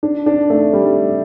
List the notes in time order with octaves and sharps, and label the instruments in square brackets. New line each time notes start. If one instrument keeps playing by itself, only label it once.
[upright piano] D4
D4
A3
G3